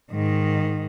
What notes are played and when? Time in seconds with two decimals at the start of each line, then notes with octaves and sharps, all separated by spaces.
0.11 G#2 D#3